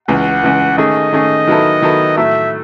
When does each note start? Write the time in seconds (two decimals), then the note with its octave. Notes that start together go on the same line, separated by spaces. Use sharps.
0.08 C#2 C#3 E3 F#5
0.43 C#2 C#3 E3
0.78 D#3 A3 C#4 G#4 D#5
1.13 D#3 A3 C#4 G#4
1.47 D#3 F#3 B3 E4 A4
1.82 D#3 F#3 B3 E4 A4
2.17 A2 F#3 A3 E5